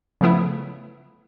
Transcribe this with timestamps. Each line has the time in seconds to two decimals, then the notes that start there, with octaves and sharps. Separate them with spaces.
0.21 C#3 F3 A3 B3 E4